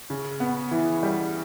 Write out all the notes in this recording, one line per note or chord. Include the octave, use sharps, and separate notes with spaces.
C#3
B3
E3
G3